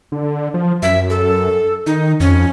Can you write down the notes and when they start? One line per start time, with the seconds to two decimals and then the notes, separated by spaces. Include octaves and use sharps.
0.12 D3
0.54 F3
0.82 F#2 E5
1.10 A4
1.86 D#3 D#4
2.20 F2 C#4